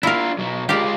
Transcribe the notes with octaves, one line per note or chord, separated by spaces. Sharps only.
D4 E4 F4 A#4
B1 F#3
G#3 F4 G4 A#4 D5